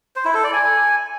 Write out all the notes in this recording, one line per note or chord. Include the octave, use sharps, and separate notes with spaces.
C5
E4
A4
D5
G#5